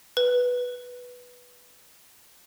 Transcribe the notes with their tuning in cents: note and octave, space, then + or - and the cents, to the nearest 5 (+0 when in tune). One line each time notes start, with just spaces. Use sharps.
B4 -5